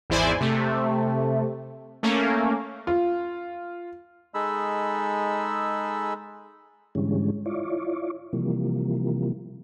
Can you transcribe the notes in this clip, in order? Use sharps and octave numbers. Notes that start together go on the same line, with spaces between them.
G#1 E2 E4 C5 D5 G#5
C3 A3
A3 A#3 C#4
F4
G#3 D#4 G#4 A4 B5 E6
G#2 D3 E3 G3 G#3 C#4
E4 F4 C#5 D5
C3 E3 F3 G3 A#3